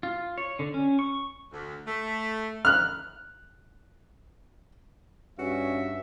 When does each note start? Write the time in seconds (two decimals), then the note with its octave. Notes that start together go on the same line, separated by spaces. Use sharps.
0.03 F4
0.38 C#5
0.59 D3
0.74 C#4
0.99 C#6
1.53 D2
1.87 A3
2.65 F6 F#6
5.39 G2 C#4 F#4 E5